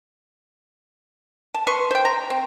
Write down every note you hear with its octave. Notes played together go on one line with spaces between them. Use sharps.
A5
B4 C6 C#6
C5 G5
A#5
C4